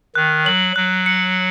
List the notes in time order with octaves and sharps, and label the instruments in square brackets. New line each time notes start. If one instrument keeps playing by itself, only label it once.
[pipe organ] D#3 [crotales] F#6
[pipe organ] F#3 [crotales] F#7
[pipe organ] F#3 [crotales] F#6
[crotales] C#7